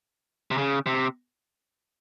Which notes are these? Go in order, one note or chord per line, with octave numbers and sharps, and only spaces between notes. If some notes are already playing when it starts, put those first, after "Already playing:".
C3
C#3
C3